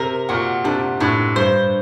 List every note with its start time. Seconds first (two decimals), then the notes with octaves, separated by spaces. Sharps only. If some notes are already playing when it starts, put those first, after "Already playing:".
Already playing: C3 A#4
0.29 A#2 F#4
0.64 C3 D4
1.00 A2 D4
1.36 G2 C5